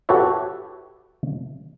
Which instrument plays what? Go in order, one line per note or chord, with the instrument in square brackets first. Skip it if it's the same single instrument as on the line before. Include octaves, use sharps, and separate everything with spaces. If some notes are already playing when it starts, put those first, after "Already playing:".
[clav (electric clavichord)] F#4 G4 A4 B4 C#5 E5